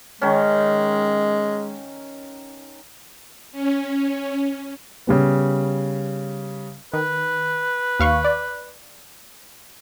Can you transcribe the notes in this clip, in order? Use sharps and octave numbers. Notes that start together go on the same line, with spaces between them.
D#3 G#3 C#4
C#4
C#3 G3 B3
D#3 B4
D#2 F5 C#6
D5